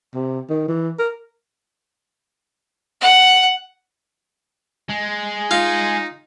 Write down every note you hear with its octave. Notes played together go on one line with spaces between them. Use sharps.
C3
D#3
E3
A#4
F#5
G#3
D#4 F4